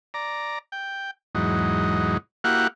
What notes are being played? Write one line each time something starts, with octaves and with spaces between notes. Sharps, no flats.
D5 A#5
G5
E2 G#2 F#3 D#4
A#3 E4 F#4 G4 F5 F#5